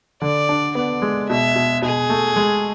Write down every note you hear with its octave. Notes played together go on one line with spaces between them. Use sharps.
D3 D5
D4
B3 D5
G#3
B2 E5
B2
B2 G#4
A3
G#3